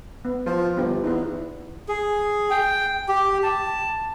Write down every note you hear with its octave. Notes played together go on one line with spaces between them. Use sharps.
B3
F3 F4 C5
G1 B3 F4 G4
E2 B3 D#4
G#4
G5
G4
A5